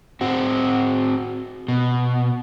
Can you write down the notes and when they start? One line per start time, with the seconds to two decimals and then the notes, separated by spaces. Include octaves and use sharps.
0.21 C4 F#4
1.68 B2